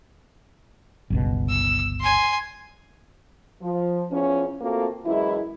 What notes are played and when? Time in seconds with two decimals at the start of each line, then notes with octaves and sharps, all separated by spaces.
1.10 G1 C#2 B2
1.49 E6
2.00 G#5 C6
3.62 F3
4.10 E2 E3 F3 C#4
4.61 A3 A#3 C4 F4 F#4 A4
5.05 F#2 E3 G#3 E4